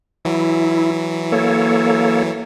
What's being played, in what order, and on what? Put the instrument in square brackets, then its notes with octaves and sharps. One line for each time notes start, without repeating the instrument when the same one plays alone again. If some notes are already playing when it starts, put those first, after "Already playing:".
[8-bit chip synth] E3 F#3 [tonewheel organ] E4
[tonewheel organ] A#3 A4 C#5